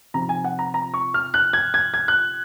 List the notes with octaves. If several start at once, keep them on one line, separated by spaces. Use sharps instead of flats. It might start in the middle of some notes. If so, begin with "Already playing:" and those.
C3 F3 C4 D#4 A#5
G#5
F#5
A#5
A#5
C#6
F6
F#6
G#6
G#6
G#6
F#6